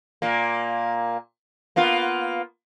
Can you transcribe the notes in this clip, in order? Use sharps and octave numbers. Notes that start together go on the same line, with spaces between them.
A#2 A#3
A#3 B3 F4